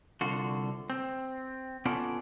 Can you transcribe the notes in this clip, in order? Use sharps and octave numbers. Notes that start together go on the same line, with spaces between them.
C2 D3 F4 F#4
C4
B3 C#4 F4 A4 D5